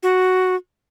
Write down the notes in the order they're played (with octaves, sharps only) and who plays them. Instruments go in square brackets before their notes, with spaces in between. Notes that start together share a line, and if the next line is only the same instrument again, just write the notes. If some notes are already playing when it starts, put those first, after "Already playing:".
[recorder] F#4